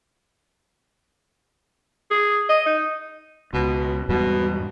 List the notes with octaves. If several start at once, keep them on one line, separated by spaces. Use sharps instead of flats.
G#4
D#5
D#4
C#2 B2
E2 G#2 B2 G3